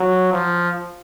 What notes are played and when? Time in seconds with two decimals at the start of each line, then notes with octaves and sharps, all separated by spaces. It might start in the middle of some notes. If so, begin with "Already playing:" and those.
Already playing: F#3
0.33 F3